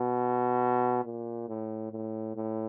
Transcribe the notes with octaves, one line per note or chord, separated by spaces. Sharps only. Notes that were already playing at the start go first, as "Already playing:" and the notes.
Already playing: B2
A#2
A2
A2
A2